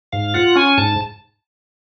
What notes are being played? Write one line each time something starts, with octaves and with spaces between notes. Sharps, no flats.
G#2 F5
F4 F#5
C#4 G#5
G#2 A5